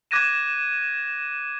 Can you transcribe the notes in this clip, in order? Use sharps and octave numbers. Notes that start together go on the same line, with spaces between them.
D6 F#6 G#6 A#6 D#7 E7